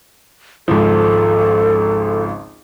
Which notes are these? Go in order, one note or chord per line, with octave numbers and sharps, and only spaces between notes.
G#1 C#2 F3 A4